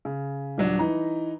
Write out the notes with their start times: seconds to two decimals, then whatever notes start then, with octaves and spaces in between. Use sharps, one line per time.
0.05 C#3
0.58 D#1 F#3 D4
0.79 E3 D#4 A#5